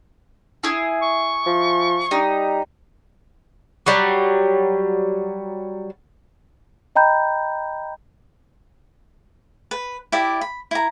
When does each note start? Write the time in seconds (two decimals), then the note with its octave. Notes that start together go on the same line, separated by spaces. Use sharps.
0.64 E4 G#4
1.02 C#6
1.46 F3
2.11 G3 D#4
3.86 F#3 G3
6.96 D#5 G5 A#5 B5 G6
9.71 B4
10.12 E4 G4 D5 E5
10.41 B5
10.71 E4 A#5